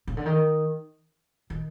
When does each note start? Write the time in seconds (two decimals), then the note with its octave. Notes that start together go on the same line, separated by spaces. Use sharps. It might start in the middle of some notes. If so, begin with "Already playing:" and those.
0.08 C#3
0.17 D3
0.26 D#3
1.50 D#3